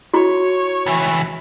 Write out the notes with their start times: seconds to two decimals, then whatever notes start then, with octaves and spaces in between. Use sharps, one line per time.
0.14 E4 F#4 C#5
0.86 C#2 E3